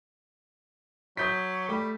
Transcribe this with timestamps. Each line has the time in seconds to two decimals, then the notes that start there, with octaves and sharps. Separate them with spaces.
1.17 F#3 D#6 G6 B6
1.68 G3 A3